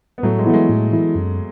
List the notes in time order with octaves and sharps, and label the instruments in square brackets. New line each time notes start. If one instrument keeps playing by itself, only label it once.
[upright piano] B3
[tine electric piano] A2 [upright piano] F#3 A3
[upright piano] G#3
[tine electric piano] E3 B3 E4 [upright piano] A3
[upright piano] G#3
[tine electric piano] A2
E3 B3 E4
F#2